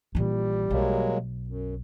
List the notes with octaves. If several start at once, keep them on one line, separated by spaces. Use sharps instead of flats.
A#1 E3 G3
B1 F#3 G#3 A#3
F#2